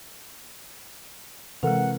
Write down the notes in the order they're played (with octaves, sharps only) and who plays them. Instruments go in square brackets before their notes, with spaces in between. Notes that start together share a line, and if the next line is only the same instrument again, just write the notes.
[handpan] C3 E3 A#4 [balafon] G#3 A4 [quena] F#5